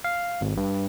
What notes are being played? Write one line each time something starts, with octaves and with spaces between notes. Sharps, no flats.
F5
G#1
G2